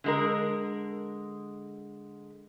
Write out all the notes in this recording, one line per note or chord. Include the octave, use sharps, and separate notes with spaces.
D3 G#3 A#4